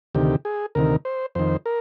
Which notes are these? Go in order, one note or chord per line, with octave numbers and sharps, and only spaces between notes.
D2 C3 D#3 G4
G#4
D2 C3 D#3 A#4
C5
F2 D#3 C5
A#4